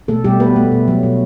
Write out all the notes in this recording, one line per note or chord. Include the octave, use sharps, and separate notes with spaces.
B2 A3 A4
B2 G3 G4
A3 B3 B4
A3
B2
F#3
B2